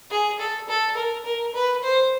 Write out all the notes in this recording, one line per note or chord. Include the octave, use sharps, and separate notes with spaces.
G#4
A4
A4
A#4
A#4
B4
C5